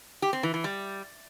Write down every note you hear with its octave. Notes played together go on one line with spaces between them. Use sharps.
G4
C4
E3
E3
G3